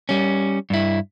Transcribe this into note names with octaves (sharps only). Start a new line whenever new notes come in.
G3 C#4
G2 E4